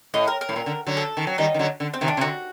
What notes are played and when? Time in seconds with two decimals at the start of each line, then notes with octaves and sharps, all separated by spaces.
0.14 A2 D#5
0.27 A#4
0.41 A#4
0.49 A2
0.56 A#2
0.66 D3
0.87 D3 F#3
0.97 A4
1.17 D#3
1.27 F#3
1.38 D#3 G3 D#4
1.54 D#3
1.59 D3 F#3
1.80 D3
1.94 C4
2.01 C3 D#3
2.08 D4
2.17 C3
2.21 D3 F#4